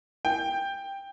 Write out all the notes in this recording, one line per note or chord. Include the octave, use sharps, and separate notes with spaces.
G5